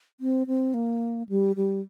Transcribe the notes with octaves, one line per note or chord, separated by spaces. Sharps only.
C4
C4
A#3
G3
G3